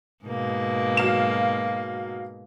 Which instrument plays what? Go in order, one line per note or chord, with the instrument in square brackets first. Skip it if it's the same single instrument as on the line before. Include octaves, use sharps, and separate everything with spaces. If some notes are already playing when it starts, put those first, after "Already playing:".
[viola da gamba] G#2 B2 A#3
[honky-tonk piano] F#3 F5 E7